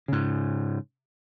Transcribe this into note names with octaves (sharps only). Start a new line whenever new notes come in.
G#2 C#3